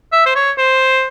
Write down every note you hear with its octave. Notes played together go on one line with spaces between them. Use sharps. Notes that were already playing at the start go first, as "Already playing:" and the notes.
E5
C5
C#5
C5